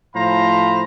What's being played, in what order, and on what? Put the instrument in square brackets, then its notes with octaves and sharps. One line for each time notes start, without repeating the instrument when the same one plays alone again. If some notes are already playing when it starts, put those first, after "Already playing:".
[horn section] A2 F3 C5 F5 A#5 B5